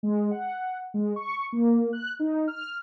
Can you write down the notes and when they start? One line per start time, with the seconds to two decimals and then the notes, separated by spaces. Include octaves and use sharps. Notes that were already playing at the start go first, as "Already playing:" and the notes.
0.03 G#3
0.31 F#5
0.94 G#3
1.16 C#6
1.52 A#3
1.93 F#6
2.19 D#4
2.47 F6